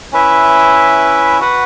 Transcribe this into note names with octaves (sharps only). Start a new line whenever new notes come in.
C#4 E4 B4 E5
F#4 B4 F#5